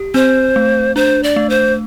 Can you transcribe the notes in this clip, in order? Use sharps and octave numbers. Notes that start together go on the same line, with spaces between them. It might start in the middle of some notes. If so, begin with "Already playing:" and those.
Already playing: G4
C4 C5
A3
D4 C5
D5
A3
C5